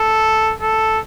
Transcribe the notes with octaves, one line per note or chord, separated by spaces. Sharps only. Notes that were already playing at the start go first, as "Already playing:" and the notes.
Already playing: A4
A4